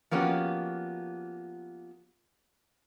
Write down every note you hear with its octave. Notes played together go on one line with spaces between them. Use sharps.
F3 A#3 B3 C#4 F#4 G4